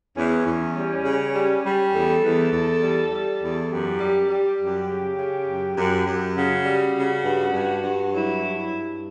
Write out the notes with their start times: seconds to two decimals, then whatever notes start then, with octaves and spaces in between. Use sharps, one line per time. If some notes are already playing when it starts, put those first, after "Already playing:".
0.16 E2 C#4
0.46 E2
0.75 G3
1.05 C#3
1.35 G3
1.63 G3
1.93 E2 A4
2.23 E2
2.52 E2
2.82 G3
3.11 G3
3.42 E2
3.70 F#2 G4
4.00 G3
4.30 G3
4.60 F#2
4.88 C#3
5.18 C#3
5.48 F#2
5.78 F#2
6.07 F#2
6.36 C#3 F#4
6.65 G3
6.95 C#3
7.25 G2
7.54 G2
7.83 G2
8.13 F#3 E4
8.43 G2
8.72 G2